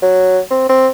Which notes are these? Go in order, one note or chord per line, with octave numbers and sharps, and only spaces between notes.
F#3
C4
C4